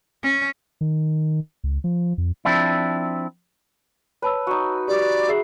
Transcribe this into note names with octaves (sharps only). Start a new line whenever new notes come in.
C#4
D#3
C#2
F3
F2
F3 C4 D4 E4
B4 C#5 A5 E6
D#4 F#4
G4 D5 D6
G#4 E5 C7